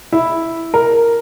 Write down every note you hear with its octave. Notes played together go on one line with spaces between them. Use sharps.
E4
A#4